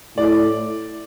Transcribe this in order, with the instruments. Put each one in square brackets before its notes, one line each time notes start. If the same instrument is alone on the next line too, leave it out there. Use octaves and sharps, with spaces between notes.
[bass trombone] A2 [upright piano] D5